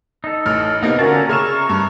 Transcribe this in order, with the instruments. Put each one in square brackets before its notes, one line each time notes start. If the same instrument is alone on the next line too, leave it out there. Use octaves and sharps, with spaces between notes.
[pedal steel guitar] D#4 A4
[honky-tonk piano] A1 F6
[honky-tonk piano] C3 A#3 B3 [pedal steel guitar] D#4
[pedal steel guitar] D3 F4 A5 [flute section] C#4 A#4 [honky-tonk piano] F#4
[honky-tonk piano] C#3 F6 E7 [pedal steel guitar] C#5 E5 [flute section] A#5 C#6
[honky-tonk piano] G2